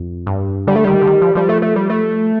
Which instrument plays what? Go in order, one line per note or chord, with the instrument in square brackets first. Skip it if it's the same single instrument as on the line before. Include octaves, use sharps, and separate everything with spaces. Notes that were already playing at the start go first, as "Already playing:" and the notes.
Already playing: [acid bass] F2
G2
[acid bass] D3 [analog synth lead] G3
[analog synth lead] A3
[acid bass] D#3 [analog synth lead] G3
[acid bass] D3
D#3
F3
[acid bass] F3 [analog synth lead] G3
[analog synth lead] A3
A3
G3
A3